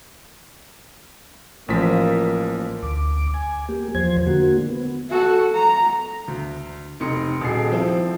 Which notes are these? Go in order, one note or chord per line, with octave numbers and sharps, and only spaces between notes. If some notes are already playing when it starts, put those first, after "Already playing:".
A1 F3 A#3 B6
D2 D6
G#5
A#3 G4
E2 F3 C5 G#6
D3 A#3 F#4
B3
F#4 A4
A#5
D2
F1 C3 D#4 D#5 C6 C#7
D#1 F#4 G#4 C7
F3 C4 E4